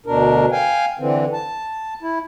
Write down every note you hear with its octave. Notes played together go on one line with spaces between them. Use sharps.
D2 B2 D4 A#4
F5 G5 G#5
D3 E3 C4
A5
E4